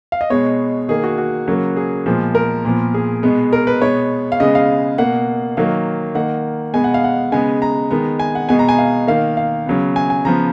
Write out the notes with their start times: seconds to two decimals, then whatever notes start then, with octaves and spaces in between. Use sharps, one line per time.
0.12 F5
0.21 D#5
0.30 B2 G#3 B3 C#5
0.88 D#3 A#3 G#4
1.04 F#4
1.18 F#4
1.48 C#3 F#3 A#3
1.76 G#4
2.06 A#2 F3 G#3 B3
2.35 A#4
2.65 A#2 F3 B3
2.94 G#4
3.23 B2 G#3 B3
3.53 A#4
3.67 B4
3.81 B2 G#3 B3 C#5
4.32 F5
4.40 C#3 G#3 B3 D#5
4.55 F5
4.98 B2 A#3 F#5
5.57 D#3 F#3 A#3 F5
6.15 D#3 A#3 F#5
6.73 B2 G#3 B3 G#5
6.84 F#5
6.94 F5
7.04 F#5
7.32 C#3 G#3 B3 G#5
7.62 A#5
7.91 D#3 G#3 B3
8.19 G#5
8.35 F#5
8.49 B2 G#3 B3 G#5
8.59 A#5
8.69 G#5
8.78 F5
9.07 D#3 A#3 F5
9.37 F5
9.66 C#3 F#3 B3
9.96 G#5
10.10 G#5
10.25 C#3 F3 B3 A#5